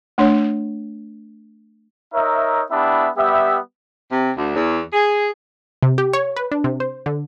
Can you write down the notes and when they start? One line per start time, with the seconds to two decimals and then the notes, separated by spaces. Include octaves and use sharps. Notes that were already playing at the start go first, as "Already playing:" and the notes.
0.18 A3 D4 C#5
2.14 D#4 A#4 C#5 E5
2.71 B3 D4 E4 G4 E5
3.17 G3 B3 G4 E5
4.11 C3
4.37 D2
4.56 E2
4.93 G#4
5.83 C3
5.98 G4
6.13 C#5
6.37 B4
6.52 D4
6.64 C3
6.80 C5
7.06 D3